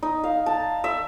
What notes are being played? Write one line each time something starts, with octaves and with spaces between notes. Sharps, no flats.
D#4
F5
A5
E5